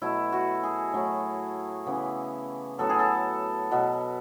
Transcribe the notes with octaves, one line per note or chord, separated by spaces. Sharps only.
B2 F#3 A3 E4
F#4
G#4
A2 F#3 A3
C#3 E3 B3
A2 F#3 B3 A4
G#4
A4
B2 F#3 B3